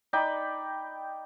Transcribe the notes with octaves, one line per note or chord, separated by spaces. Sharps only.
D#4 D5 G5 B5